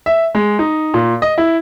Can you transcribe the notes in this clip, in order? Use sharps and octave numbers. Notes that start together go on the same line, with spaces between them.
E5
G#3
D#4
A#2
D#5
E4